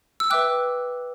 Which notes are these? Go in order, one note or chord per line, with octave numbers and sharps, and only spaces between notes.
E6
B4 E5 G5 D6 F#6